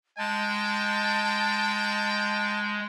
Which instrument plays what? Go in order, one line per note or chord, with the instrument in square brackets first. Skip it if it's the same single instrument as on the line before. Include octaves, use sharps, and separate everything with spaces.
[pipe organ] G#3 [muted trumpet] G5 [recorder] A5